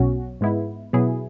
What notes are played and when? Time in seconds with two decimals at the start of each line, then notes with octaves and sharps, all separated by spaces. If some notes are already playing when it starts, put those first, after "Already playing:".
Already playing: B1 B2 F#3 C#4 F#4
0.41 G#2 G#3 B3 E4
0.93 B2 F#3 B3 E4 G#4